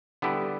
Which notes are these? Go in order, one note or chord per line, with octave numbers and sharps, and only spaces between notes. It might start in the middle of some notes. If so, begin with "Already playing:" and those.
D3 G3 B3 E4 G4